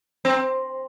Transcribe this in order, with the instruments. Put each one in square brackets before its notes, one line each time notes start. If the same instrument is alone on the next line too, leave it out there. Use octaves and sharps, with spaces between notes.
[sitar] C4